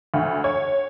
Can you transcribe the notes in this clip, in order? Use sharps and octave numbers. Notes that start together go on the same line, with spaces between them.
D2
C#5